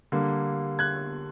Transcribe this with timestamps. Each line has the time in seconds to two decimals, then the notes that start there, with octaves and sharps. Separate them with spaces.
0.12 D3 G3 A#3
0.79 F#6 G#6